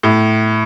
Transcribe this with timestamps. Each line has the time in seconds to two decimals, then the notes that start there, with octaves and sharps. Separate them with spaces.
0.03 A2